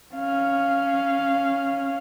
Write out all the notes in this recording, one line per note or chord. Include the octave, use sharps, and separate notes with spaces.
C#4 F5